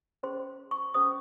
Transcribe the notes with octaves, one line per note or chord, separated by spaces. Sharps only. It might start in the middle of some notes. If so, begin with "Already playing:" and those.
C#4 G#4 C5 C6
C#6
C#4 G#4 C5 D#6